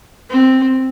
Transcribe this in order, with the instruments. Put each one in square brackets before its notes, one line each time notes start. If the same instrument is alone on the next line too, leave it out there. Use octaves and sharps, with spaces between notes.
[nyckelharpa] C4